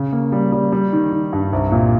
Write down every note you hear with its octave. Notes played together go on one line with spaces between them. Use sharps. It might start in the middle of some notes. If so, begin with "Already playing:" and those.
Already playing: C#3
A#3
G3
G3
G3
D#3
D#3
G2
C2
A#2